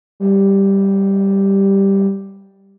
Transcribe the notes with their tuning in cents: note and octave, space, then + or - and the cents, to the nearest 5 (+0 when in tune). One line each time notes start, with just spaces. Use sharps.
G3 +0